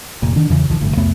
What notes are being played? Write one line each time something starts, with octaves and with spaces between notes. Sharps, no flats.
F1 A#2
D#3 D4
E2 C#3 E3
B1 D#3 F3
D1 G1 D2
C2 F2 A3 B3